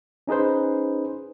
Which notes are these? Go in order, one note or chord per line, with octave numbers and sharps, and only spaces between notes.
C#4 D#4 G#4 B4 C5